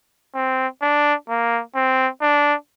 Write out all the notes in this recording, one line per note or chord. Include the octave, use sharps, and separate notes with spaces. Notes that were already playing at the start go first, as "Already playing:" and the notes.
C4
D4
A#3
C4
D4